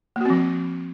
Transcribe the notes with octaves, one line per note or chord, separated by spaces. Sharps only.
F3 A#3 C4 F#4